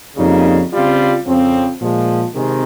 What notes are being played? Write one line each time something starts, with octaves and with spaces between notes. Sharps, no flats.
F2 C#3 G3 A#3 D#4
C#3 G3 C4 F4
F2 C#3 F3 C4
A#2 F3 G#3
C3 D#3 G#3 C4